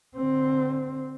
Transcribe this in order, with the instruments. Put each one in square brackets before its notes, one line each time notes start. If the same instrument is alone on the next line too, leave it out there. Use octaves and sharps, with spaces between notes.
[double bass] D3 C4